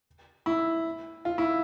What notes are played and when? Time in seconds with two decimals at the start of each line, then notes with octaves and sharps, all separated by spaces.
0.46 E4
1.25 F4
1.38 E4